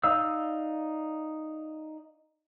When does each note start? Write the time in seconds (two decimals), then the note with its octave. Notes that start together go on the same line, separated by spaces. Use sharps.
0.03 D#4 D5 F5 E6